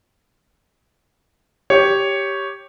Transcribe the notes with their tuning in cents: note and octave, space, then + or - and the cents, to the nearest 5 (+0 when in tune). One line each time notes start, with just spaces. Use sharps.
G4 +0 C#5 +0